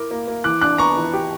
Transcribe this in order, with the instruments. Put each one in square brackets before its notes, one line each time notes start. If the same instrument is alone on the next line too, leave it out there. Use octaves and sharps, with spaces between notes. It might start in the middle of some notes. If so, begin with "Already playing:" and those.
Already playing: [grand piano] E4 A#4 [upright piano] D6
[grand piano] A#3
A#3
[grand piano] E3 [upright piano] D6 F#6
[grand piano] D4 [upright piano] D6 F#6
[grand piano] B3 [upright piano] A#5 C#6
[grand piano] E3
G4